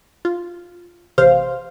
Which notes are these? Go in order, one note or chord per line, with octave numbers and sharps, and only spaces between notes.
F4
A1 C3 C5 F5